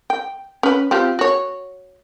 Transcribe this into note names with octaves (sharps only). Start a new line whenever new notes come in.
G5
C#4 B4
C4 F4 G4
F#4 C#5